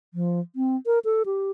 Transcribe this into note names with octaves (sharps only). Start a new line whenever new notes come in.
F3
C4
A#4
A4
G4